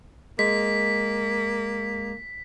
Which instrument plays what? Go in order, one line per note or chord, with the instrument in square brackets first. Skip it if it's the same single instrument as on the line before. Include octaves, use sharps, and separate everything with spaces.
[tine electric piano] G#3 [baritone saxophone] A#3 [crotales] B6